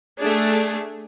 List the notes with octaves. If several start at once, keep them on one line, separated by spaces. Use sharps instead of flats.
A3 D4 G#4